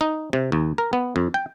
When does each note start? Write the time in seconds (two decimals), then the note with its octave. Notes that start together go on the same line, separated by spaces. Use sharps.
0.01 D#4
0.33 C3
0.52 D#2
0.78 A#4
0.93 B3
1.16 F2
1.34 G5